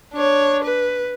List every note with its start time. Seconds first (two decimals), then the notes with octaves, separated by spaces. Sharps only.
0.13 D4 C#5
0.64 B4